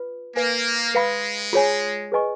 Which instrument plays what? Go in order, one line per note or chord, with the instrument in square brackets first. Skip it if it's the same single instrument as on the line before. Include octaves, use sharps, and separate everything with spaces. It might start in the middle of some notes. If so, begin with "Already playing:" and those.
Already playing: [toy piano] F4 B4
[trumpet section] A#3 [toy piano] B4 F5 G#5
[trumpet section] G#3 [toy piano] B4 F5 B5
[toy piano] F4 G#4 C#5 G#5
G#4 B4 D#5 G#5 C#6